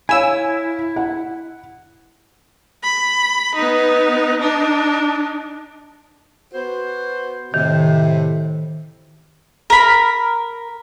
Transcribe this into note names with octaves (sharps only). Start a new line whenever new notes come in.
E4 C#5 F5 G#5 B5 E6
F#5
B5
B3 D#4
D4 D#4
B3 F#4 C5
A2 C3 D#3
A#4 B5